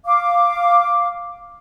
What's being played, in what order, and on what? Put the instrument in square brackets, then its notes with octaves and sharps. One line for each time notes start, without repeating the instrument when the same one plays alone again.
[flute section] F5 D6